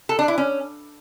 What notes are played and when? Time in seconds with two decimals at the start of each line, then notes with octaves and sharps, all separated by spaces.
0.09 A4
0.19 D4
0.28 E4
0.38 C#4